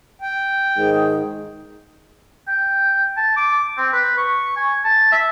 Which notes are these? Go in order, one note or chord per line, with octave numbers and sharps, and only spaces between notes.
G5
G#2 D#3 G#4
G5
A5
D6
C4
B4
C#6
G#5
A5
E5